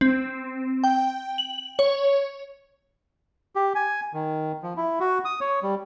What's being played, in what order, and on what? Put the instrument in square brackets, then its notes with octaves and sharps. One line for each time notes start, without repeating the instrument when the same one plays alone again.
[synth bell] C4
G5
F#7
C#5
[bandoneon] G4
G#5
D#3
F3
E4
F#4
D#6
C#5
G3